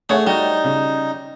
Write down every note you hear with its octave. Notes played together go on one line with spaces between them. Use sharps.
A3 G#4 C#5 F#5
G3 D#4 F#4
C#3